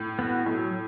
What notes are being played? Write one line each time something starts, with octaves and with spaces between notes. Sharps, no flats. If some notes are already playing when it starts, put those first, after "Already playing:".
Already playing: A2
B3 F#4
A2 F#3